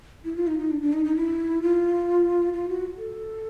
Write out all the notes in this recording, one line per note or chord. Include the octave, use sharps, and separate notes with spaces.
E4
F4
D#4
D#4
D4
D4
D#4
D#4
E4
F4
F4
F#4
A4